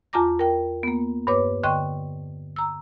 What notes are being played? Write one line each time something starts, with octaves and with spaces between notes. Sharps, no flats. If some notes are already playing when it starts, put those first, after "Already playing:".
E2 F4 A5 A#5 D6 A#6
A#4 G5
A#3 B3
G2 B4 C#5 D6
D3 D#5 G5 C6 C#6
A#5 E6